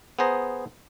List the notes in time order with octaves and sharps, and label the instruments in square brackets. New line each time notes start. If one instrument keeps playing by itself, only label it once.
[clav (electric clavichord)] B3 G#4 C5 A#5